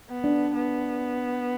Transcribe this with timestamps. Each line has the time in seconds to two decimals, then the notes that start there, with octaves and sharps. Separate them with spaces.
0.09 B3
0.24 D4
0.55 B3